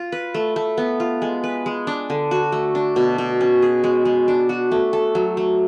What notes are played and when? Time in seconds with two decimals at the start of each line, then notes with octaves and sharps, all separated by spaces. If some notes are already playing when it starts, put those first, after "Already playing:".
Already playing: F4
0.12 B4
0.34 A3
0.56 A3
0.78 B3
1.00 F4
1.22 G#3
1.44 B4
1.66 G#3
1.87 D4
2.10 D3
2.31 F#4
2.52 A3
2.75 D4
2.96 B2
3.18 B2
3.41 C#4
3.62 G#4
3.84 G#3
4.05 G#3
4.28 D4
4.49 F#4
4.72 A3
4.93 A4
5.15 F#3
5.37 A3